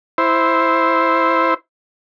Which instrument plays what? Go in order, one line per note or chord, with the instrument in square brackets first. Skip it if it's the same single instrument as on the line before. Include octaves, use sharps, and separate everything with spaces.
[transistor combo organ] E4 C5